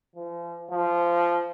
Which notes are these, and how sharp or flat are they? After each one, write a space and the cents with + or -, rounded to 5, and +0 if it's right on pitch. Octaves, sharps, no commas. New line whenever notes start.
F3 -35
F3 -15